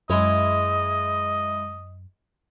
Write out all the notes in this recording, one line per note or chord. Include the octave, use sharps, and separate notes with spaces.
F#2 G#3 E4 C#5 D#5